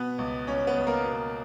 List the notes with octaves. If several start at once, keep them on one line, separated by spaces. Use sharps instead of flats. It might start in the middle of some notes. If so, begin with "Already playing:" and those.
Already playing: B2 B3 B4
C#2
C#2 C#4 C#5
B3 B4
C#2
A#3 A#4
B2